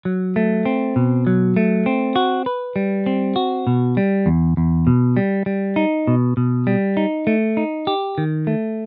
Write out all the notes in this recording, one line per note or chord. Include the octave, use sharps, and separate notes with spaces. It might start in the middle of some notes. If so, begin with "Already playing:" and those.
F#3
A3
C4
B2
F#3
A3
C4
F#4
B4
G3
C4
F#4
B2
G3
E2
E2
B2
G3
G3
D#4
B2
B2
G3
D#4
A3
D#4
G4
D#3
A3